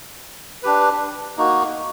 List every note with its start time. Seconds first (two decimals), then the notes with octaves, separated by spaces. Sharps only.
0.63 D4 G4 B4
1.38 A#3 D#4 F#4